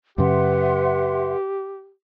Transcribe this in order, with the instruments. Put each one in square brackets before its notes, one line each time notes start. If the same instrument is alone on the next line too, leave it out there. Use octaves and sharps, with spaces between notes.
[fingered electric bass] F#2 C#3 [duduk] G4 [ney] B4 [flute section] E5 F#5 C6